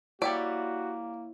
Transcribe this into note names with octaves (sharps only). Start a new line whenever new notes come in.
G3 A#3 E4 F#4 G4 C#5 D5